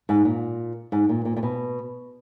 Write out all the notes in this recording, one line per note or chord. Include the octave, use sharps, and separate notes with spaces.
G#2
A#2
G#2
A#2
A#2
A#2
B2